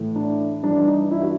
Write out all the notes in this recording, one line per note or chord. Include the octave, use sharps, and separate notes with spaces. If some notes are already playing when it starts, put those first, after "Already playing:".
Already playing: A2 E3
D4
G2 E3 D4
D4
D#4
E4
F#4